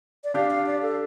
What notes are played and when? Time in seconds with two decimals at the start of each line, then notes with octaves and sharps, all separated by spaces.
0.24 D5
0.34 D4 G4 F5
0.51 F5
0.66 D5
0.82 A4